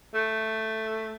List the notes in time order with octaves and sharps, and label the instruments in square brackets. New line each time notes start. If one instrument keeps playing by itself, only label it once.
[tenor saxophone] A3